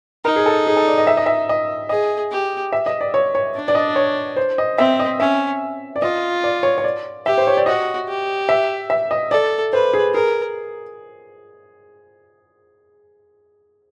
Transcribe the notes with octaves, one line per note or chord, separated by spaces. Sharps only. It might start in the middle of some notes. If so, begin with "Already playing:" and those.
D#4 A#4
G#4
A4
G#4
A4
D5
D#5
E5
D#5
E5
D#5
G#4 D#5
G4
E5
D#5
D5
C#5
C#5
D4
D5
D#5
C#5
C5
D#5
C4 E5
D#5
C#4 E5
D5
F4 D#5
D5
C#5
C#5
D5
G4 E5
C5
C#5
D5
F#4 D#5
G4
E5
E5
D#5
A4 D5
B4 C5
G#4
G#4 A#4